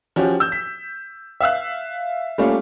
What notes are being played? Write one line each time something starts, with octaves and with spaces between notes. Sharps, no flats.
F3 C#4 F#4 G4
E6 G6
B6
E5 F5 E6 F#6
G3 A3 A#3 C#4 F4